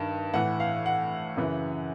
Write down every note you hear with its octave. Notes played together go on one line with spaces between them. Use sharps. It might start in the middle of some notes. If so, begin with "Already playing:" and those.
Already playing: G2 D#3
A2 E3 F#5
F5
F#5
F#2 C#3 E3